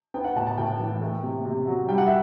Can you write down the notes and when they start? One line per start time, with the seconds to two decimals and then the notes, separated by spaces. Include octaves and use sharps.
0.14 B3 G5
0.24 F#5
0.36 A2 A5
0.47 A5
0.58 A2 G5
0.79 E3
1.01 A3
1.23 C3
1.45 C3
1.67 F#3
1.89 G3 G5
1.98 F#5
2.07 E5